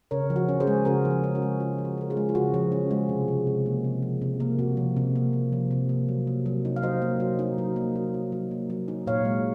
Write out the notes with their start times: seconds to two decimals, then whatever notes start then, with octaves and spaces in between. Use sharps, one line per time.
0.11 C#3 A#4 C#5
0.30 F3
0.36 F#4
0.49 C#4
0.60 G#4 C5
0.67 G#3
0.85 C#3 F#4 A#4
1.05 F3
1.11 F#4
1.24 C#4
1.35 F#4 A#4
1.42 G#3
1.60 C#3 F4
1.78 F3
1.85 F#4
1.98 C#4 A#4
2.10 F4 G#4
2.17 G#3
2.29 F4
2.35 C#3 F#4
2.54 F3
2.72 C#4
2.91 G#3
3.09 C3
3.28 F3
3.47 C3
3.66 A#3
3.84 C3
4.02 F3
4.22 C3
4.40 A#3
4.59 C3 F#4
4.77 F3
4.96 C3
5.16 A#3
5.33 C3
5.52 F3
5.71 C3
5.89 A#3
6.08 F#3
6.27 A#3
6.46 F#3
6.65 D#4
6.76 F5
6.82 F#3 C5 D#5
7.02 A#3
7.20 F#3
7.39 D#4
7.58 F#3
7.76 A#3
7.96 F#3
8.14 D#4
8.32 F#3
8.51 A#3
8.70 F#3
8.88 D#4
9.07 A#2 C#5 F5
9.25 G#3